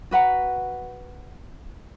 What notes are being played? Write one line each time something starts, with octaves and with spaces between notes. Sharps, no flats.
F#4 B4 F#5 A#5